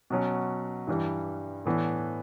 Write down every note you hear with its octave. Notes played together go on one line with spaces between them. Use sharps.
B2 F#3 C#4
G2 E3 G3
A2 E3 B3 D4